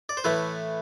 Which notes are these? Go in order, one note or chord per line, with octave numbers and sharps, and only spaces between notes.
D5
C5
A2 E3 A3 B4